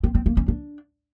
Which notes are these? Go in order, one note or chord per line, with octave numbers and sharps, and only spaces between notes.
C4
C4
A#3
C#4
D4